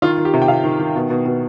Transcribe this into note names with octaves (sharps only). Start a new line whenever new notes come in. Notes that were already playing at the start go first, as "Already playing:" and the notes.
D#3 F4
D#3
G4
C3
G5
C3 F5
D#3
D#3
B2
B2
B2